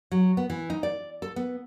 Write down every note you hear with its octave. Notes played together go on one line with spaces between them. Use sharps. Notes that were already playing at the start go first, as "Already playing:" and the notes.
F#3
B3
E3
D#4
D5
A4
B3